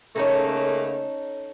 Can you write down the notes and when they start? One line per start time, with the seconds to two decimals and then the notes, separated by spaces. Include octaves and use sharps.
0.16 C#3 A3 A#3 C#4 D#4 A4